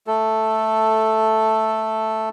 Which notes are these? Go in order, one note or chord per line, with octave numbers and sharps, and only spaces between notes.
A3 A4